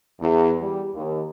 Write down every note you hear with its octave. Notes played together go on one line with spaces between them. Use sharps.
E2
G3
D#2